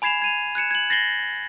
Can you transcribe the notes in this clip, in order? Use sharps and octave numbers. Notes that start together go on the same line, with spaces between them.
G#5 B5 G#6 C7 E7 F7
G#6 D#7 F7
F#6 G#6 C#7 E7
G#6 F#7
A6 A#6 C7 F#7 G7